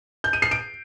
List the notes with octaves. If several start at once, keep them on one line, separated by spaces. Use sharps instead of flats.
G6
D#7
C7
D7